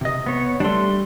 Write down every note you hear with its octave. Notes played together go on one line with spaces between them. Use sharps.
C3 D#5
B3 C#5
G3 A3 D4 C6